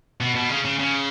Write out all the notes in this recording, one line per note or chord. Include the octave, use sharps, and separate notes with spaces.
B2
B2
C#3
C#3
C#3